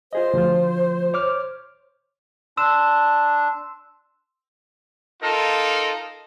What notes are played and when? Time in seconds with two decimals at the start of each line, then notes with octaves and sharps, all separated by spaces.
0.13 F4 G#4 C5 D#5
0.34 D2 F3 F4
1.14 C#5 D6 F6
2.57 D4 C6 E6 E7
5.23 D#4 F4 A4 A#4